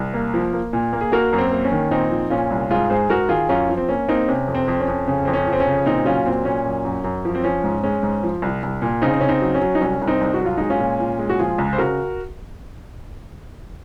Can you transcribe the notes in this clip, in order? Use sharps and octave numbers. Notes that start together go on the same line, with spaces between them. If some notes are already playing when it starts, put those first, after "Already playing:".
Already playing: C2
A#3
F3
A#3
A#2
A#3
G#4
A#3 F#4 A#4
F#2
C4
A#3
C#4
D#3
A#2 C4 D#4
F3
A#2 C#4 F4
C2
G#2 F4 G#4
G#2 G#4 C5
G#2 F#4 A#4
D#3 F4 G#4
F#2 C#4 F4
F3
C4
A#3 C#4
A#3 C4 D#4
C3 C#4
F2
C4
F2
C#4
F2
C#3 C#4
F2 C4
C#4
F3
C4
C#4
C#3
A#2 C4 D#4
F#3 C#4 F4
A#2 C4
A#2 C#4
F#2
F#2
F#2
F3
C4
F3 C#4
G#2
G#3 C#4
G#2
F3
C2
C2
A#2
C#3 C4 D#4
C4
C#3 C#4
C4 D#4
F#3
C#4
F#3
D#4
C2 C#4
C2
C4 D#4
C2
F#4
F#3 F4
G#3 D#4
C#4 F4
A#2
A#2
G#3
F#4
F3 F4 G#4
C#2
C5
C#3 F#4 A#4